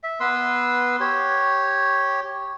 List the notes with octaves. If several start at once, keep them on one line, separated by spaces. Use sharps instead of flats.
E5
B3 B4 C6 E6
G4 C#5